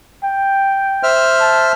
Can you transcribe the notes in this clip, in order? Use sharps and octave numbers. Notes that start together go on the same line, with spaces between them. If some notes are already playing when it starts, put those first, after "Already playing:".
G5
C5 E5 F6
A5